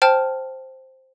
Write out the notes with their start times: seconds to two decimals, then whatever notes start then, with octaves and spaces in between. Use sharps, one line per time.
0.02 C5 G5 A5 F6